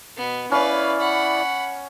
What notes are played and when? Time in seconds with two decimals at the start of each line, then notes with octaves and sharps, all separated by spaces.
0.17 B2 B3
0.51 C#4 E4 B4 D5 F5 C#6
1.00 F#5 B5